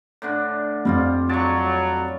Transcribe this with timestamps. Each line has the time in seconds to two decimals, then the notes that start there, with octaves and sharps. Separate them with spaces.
0.22 A2 D3 D4
0.85 F2 G3 C4 F4
1.29 F#3 A5 C#6